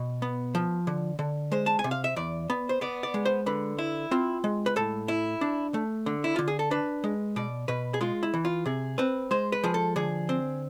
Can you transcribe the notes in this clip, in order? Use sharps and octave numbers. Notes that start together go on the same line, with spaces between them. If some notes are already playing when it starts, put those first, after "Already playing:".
Already playing: B2
B3
F3
D3
D3
G#3 C5
A5
G#5
C3
F5
E5
E2 D5
B3
C5
B3 D5
D5
G#3
C5
D3 B4
E4
C4 F4
G#3
B4
A2 A4
E4
D4
A3
D3
E4
D3 F4
G#4
A4
D4 B4
G#3
B2 D5
B2 B4
G#4
G#3 F4
E4
E3
F4
C3 G#4
C4 B4
G#3 C5
B4
F3 G#4
A4
D3 G#4
C4